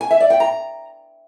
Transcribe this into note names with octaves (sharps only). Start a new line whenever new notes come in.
G#5
E5
D5
G5
A#5